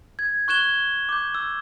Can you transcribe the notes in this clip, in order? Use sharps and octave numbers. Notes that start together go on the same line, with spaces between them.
G#6
C#6 F#6 G#6 E7 G7
D6 G6
E6